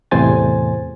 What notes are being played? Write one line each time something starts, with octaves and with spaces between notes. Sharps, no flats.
E2 A2 C3 C5 G#5 A6